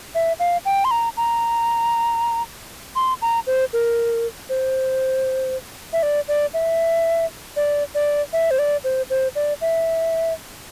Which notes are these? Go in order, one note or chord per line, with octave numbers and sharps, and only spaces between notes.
E5
F5
G5
C6
A#5
A#5
C6
A#5
C5
A#4
C5
E5
D5
D5
E5
D5
D5
E5
C5
D5
C5
C5
D5
E5